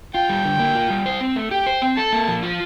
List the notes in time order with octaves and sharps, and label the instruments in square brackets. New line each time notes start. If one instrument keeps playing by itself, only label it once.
[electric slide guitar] F4 [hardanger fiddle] G5
[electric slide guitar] G3
D3
A#3
F4
G3
C5
C4
A3
[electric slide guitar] G4 [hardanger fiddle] G5
[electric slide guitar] C5
C4
[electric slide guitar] A4 [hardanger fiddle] A5
[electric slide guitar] A#3
F3
F4